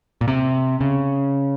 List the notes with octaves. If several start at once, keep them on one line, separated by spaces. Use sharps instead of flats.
A#2
C3
C#3